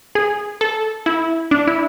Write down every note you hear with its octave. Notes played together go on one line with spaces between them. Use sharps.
G#4
A4
E4
D4
E4